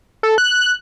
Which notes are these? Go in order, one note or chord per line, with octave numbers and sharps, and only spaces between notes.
A4
F#6